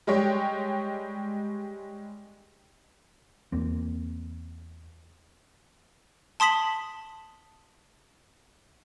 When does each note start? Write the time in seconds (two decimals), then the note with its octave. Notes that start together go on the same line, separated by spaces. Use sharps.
0.07 G3 G#3 G4 C#5 G5
3.52 E2 A#3 C4
6.40 A5 C6 D#6 B6 F#7